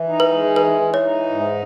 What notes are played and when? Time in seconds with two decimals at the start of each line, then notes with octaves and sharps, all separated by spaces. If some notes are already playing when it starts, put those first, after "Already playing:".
Already playing: E3
0.09 D#4
0.20 B4
0.32 G#3
0.56 E3 B4
0.81 E3
0.94 C#5
1.05 D#4
1.29 G#2